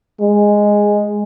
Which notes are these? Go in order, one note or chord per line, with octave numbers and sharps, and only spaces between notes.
G#3